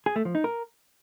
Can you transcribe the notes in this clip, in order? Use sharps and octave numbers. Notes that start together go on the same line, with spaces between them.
G#4
A3
F3
D#4
A#4